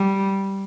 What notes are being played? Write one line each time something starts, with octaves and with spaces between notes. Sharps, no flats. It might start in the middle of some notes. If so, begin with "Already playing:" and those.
Already playing: G3